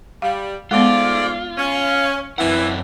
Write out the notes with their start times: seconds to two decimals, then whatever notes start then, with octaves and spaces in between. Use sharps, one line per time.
0.22 G3 F5
0.71 G#2 G#3 A3 B3 F4 D5
1.57 C#4
2.38 F#2 E3 C4 F#5